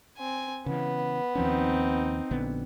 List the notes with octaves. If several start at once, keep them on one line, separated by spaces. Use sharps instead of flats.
C4 G#5
C#3 E3 B3
D#2 F3 C4 C#4 D#4
A#1 D3 B3